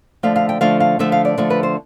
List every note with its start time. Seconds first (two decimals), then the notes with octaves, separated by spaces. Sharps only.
0.23 D3 F3 A3 F5
0.36 F5
0.49 G5
0.61 D3 F3 A3 F5
0.80 F5
0.99 D3 F3 A3 E5
1.12 F5
1.25 D5
1.38 D3 F3 A3
1.50 B4
1.63 C5